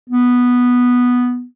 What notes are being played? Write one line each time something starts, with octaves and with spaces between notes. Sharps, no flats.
B3